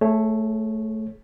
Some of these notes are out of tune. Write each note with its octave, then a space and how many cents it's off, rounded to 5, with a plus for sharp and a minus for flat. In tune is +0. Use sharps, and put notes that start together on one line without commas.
A3 +0 G#4 +30 C#5 -10